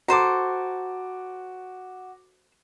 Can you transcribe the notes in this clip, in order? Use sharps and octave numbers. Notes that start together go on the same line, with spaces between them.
F#4 A4 C5 A#5 D6